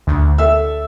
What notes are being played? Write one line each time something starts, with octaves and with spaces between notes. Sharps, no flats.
D2
A4 E5 E6